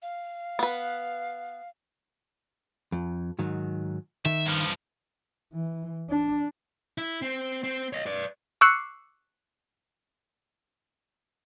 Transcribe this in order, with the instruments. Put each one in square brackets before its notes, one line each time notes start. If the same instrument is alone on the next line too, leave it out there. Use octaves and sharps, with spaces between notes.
[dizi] F5
[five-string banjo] B3 B4
[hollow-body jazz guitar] F2
G#2 D#3 F#3
[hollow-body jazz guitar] D#3 [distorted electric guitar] E5
[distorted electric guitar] G2 F3
[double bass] E3
D4
[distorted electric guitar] E4
C4
C4
C#5 D#5
B4 D5
[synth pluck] C#6 D6 E6 F#6 C7 C#7